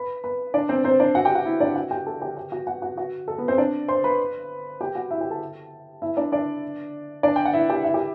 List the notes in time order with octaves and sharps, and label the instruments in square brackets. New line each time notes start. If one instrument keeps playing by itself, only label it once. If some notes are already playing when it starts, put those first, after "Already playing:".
Already playing: [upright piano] B4 B5
B4 B5
D4 D5
C4 C5
C4 C5
D4 D5
F#4 F#5
G4 G5
F#4 F#5
E4 E5
D4 D5
F#4 F#5
G4 G5
A4 A5
G4 G5
G4 G5
F#4 F#5
F#4 F#5
F#4 F#5
F#4 F#5
A4
B3 B4
C4 C5
D4 D5
C5 C6
B4 B5
G4 G5
F#4 F#5
E4 E5
G4 G5
A4 A5
E4 E5
D4 D5
D4 D5
D4 D5
G5
F#5
E4 E5
G4 G5
E4 E5
G4